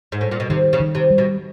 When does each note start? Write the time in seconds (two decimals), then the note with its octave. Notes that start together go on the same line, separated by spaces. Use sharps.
0.12 G#2
0.21 A2
0.31 A#2
0.40 B2
0.50 C3 D#3
0.73 C#3
0.80 D#3
0.95 C3
1.10 G3
1.18 B2